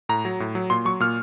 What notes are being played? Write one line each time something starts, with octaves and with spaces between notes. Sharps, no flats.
A2 A#5
F#3
A2
F#3
A#2 C6
F#3 C#6
A#2 F6